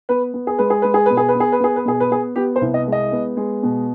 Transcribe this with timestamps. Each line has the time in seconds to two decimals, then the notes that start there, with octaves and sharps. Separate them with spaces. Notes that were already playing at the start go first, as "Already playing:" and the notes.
0.09 B3 B4
0.34 B3
0.47 G#4
0.58 G#3 B4
0.70 G#4
0.82 G#3 B4
0.94 G#4
1.06 B2 B4
1.17 G#4
1.28 B4
1.35 B3
1.40 G#4
1.52 B4
1.60 B3 G#4
1.76 B4
1.85 B2 G#4
2.00 B4
2.11 B3 G#4
2.36 B3 G4
2.56 C5
2.61 C2
2.74 D#5
2.87 G#3
2.92 D#5
3.12 B3
3.37 G#3
3.63 B2